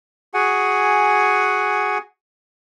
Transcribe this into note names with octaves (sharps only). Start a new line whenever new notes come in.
F#4 G#4 F#5 G#5